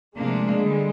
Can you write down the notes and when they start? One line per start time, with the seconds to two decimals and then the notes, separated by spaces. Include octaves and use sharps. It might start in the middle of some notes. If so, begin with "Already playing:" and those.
0.16 D2 C3 F3 G#3 A#3 D4
0.60 D3 G3